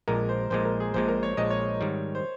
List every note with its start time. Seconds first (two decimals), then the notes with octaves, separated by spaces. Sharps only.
0.08 A#1 A#2 G#3 A#4
0.29 C5
0.50 A#1 A#2 G#3 C5
0.65 A#4
0.80 G#4
0.94 A#1 A#2 G#3 C5
1.08 A#4
1.23 C#5
1.37 A#1 A#2 G#3 D#5
1.50 C#5
1.81 G#2 D#3 G3
2.15 C5